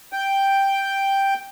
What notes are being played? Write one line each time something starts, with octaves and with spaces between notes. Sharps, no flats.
G5